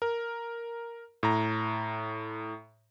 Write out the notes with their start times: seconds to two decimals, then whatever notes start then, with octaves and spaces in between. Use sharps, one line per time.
0.02 A#4
1.23 A2 A#5